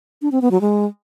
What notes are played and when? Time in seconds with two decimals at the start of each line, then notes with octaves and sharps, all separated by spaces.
0.22 D4
0.32 C4
0.42 B3
0.51 F#3
0.61 G#3